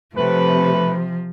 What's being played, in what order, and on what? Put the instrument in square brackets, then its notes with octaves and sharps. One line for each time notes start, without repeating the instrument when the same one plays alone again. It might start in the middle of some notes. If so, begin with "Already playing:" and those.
[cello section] C3 [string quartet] F3 [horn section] A3 B4